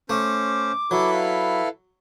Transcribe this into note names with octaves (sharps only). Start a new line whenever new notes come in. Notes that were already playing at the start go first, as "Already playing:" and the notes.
A3 C#4 C5 D6
F#3 E4 A4 B4
F5